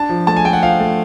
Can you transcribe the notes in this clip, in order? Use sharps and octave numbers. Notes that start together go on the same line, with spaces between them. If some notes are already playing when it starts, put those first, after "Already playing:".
Already playing: D4 A5
F3
A3 A5
G#5
A3 G5
F#5
F3 F5
A3